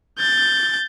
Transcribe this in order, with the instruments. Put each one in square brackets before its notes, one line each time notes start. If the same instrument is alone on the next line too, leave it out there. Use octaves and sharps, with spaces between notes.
[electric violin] G6 A6